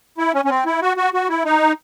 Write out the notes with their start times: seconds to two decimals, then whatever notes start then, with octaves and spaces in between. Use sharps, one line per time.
0.18 E4
0.34 C#4
0.45 C#4
0.50 C4
0.66 E4
0.82 F#4
0.97 F#4
1.14 F#4
1.29 E4
1.45 D#4